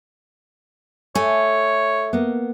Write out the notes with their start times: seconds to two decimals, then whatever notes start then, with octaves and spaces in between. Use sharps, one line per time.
1.15 A3 C#5 G#5
2.13 A#3 B3